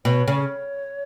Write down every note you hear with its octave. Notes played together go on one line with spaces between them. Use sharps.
B2 C#5
C#3